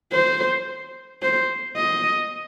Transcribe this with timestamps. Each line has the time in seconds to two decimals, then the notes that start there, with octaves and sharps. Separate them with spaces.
0.12 C5
1.22 C5
1.77 D#5